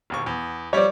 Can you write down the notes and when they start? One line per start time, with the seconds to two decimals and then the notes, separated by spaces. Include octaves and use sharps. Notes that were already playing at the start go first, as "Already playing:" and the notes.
0.10 E1 D#2 C#6
0.26 E2
0.73 F3 G3 C#5 D5